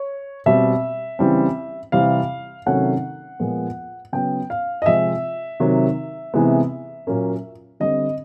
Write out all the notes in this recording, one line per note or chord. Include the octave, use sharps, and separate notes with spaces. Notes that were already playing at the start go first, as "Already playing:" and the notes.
Already playing: C#5
B2 G3 C4 E5
C#3 E3 G3 C4
C3 E3 G3 C4 F5
C3 D#3 F#3 A3 C#4 F#5
A#2 F3 G#3 B3
C#3 F#3 B3 G5
F5
D#5
C3 F3 G#3 C4 E5
C3 D#3 F#3
C3 E3 G#3 B3
A#2 F#3 A#3 C#4
D3 G3 C4 D#5